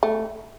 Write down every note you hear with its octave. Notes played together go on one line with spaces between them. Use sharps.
A3